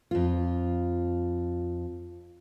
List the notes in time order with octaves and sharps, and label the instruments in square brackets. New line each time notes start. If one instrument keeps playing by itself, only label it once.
[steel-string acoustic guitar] F2 F4